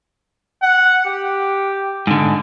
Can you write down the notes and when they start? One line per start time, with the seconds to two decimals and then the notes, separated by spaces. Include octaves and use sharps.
0.62 F#5
1.05 G4
2.07 G#2 D3